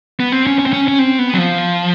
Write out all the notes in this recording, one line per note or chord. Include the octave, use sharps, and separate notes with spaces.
B3
C4
C#4
C#4
C4
C#4
C#4
C4
B3
F#3
F3